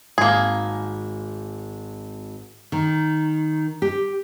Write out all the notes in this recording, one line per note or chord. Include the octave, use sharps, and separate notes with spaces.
G#1 A#3 G#4 A#5
D#3
G4